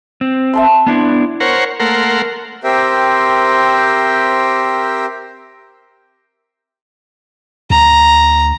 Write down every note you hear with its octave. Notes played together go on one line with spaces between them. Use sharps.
C4
E5 A5 C6
B3 D4 E4
A#4 C5 C#5 F#5
A3 A#3 A#4 F#5 C6
C4 G4 A#4 C5 E5 G5
D2 A#5